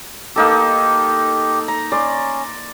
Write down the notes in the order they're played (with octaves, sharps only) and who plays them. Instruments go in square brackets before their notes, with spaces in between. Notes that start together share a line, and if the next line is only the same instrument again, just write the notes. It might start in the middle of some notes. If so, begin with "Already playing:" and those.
[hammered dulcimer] A#3 D#4 A4 [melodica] G4
[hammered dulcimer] A#5
[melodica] C#4 [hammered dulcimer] D5 C6